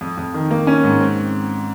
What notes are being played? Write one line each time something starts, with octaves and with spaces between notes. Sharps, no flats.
F2
F2
D#3
A#3
C#4
G#2
C4